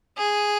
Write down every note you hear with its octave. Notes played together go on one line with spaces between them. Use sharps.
G#4